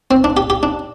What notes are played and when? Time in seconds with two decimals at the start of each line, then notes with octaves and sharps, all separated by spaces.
0.11 C4
0.24 D4
0.37 G4
0.50 G4
0.63 D4